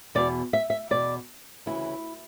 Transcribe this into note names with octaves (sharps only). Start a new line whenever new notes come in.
E2 B2 D5
E5
E5
E2 B2 D5
D2 C#3 E3 E4